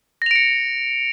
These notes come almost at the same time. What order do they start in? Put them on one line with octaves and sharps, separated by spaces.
A#6 F7 D7 C#7